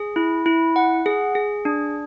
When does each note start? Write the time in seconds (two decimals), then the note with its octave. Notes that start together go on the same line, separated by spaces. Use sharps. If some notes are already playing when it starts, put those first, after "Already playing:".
Already playing: G#4
0.16 E4
0.46 E4
0.76 F#5
1.06 G#4
1.35 G#4
1.65 D4